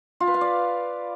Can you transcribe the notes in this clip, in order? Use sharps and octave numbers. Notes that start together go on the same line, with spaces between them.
F4
B4
F5
D5